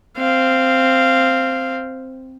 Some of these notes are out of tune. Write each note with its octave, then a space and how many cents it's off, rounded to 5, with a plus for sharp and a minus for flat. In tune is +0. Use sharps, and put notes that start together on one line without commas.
C4 +0 F5 -10